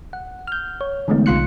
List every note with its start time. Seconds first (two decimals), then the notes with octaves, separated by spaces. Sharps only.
0.13 F#5
0.47 F6 G6
0.81 C#5
1.08 D3 E3 G#3 A3 B3 D#4
1.26 B1 C3 F4 C6 F#6 C#7